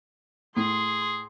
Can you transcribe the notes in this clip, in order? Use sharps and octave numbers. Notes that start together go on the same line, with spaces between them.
A2 G#4 C6